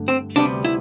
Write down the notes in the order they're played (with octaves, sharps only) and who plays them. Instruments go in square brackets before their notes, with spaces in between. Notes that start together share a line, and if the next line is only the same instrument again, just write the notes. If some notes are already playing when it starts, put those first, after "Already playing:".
Already playing: [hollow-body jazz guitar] G2 D3 A3
C4
D2 C3 G3 B3 D4
E4